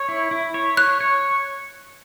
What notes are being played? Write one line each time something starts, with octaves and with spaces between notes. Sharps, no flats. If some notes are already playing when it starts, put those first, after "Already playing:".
Already playing: C#5
E4
E4
C#5
C#5 F#6
C#5